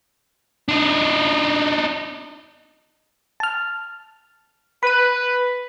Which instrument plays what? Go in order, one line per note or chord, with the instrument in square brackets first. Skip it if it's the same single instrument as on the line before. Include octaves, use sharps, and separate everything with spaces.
[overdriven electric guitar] D4 D#4
[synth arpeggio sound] A5 F6
[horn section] B4 [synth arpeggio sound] B5 D#7